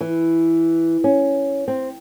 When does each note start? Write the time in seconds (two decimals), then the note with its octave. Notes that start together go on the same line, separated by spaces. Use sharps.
0.01 E3
1.04 C#4
1.68 C4